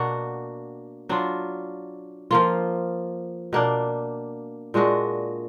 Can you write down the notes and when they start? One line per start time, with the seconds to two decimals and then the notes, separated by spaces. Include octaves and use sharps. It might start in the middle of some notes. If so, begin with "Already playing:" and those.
Already playing: B2 A#3 D4 F#4
1.09 F#3 D4 F4
2.31 F3 A#3 F4
3.53 B2 A#3 D4
4.74 A#2 G#3 D4 F#4